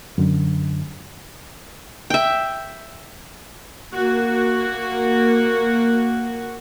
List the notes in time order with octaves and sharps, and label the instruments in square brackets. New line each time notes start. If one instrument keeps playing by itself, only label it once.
[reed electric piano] F#2 D3
[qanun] E5 G5
[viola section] A#3 F#4